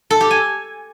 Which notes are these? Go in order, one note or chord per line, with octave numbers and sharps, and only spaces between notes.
A4
G4
G#5